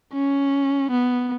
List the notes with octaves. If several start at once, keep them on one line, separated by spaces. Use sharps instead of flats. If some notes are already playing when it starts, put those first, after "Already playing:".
C#4
B3